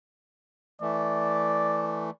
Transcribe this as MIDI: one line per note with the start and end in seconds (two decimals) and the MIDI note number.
0.81 2.10 52
0.81 2.10 57
0.81 2.11 74